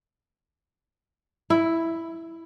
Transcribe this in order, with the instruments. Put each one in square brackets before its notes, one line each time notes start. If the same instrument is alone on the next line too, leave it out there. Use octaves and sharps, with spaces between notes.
[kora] E4